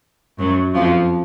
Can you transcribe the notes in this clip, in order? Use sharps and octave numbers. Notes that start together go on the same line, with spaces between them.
F#2 F#3
F2 F3